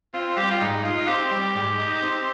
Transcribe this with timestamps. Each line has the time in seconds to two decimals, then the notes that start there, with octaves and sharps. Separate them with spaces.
0.14 C4 F4
0.37 G3 G4
0.51 F4
0.61 G#2 D#4
0.84 D#4 F4
1.08 C4 G4
1.31 G3
1.55 G#2
1.78 D#4
2.02 C4